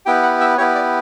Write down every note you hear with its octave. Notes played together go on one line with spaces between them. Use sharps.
B3 E4 G4 G5
F#5
E5
B3 E4 G4 C#5
D5